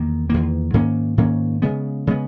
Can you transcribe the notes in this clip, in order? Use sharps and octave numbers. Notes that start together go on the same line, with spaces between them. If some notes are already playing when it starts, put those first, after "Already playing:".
Already playing: E2 D#3 A#3
E2 D#3 A#3
G#2 D#3 A#3 C#4
G#2 D#3 A#3 C#4
C#3 G#3 B3
C#3 G#3 B3